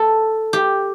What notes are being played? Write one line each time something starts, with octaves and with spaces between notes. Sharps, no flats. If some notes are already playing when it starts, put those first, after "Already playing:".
Already playing: A4
G4